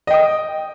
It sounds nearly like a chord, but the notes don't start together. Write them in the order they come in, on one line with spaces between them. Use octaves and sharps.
D#5 G5 D#6